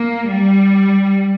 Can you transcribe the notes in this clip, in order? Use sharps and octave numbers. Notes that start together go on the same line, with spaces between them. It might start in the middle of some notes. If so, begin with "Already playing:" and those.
Already playing: A#3
G3